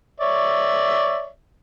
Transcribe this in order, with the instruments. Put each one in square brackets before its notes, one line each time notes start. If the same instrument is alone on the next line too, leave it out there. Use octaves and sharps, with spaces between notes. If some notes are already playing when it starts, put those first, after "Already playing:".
[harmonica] C#5 D5 E5